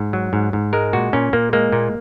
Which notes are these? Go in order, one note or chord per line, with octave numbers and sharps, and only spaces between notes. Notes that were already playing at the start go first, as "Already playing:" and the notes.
Already playing: G#2
F#3
G#2
G#2
G#3 A#4
A#2 F#4
A#2 C#4
A#2 A#3
G#3 A#3
A#2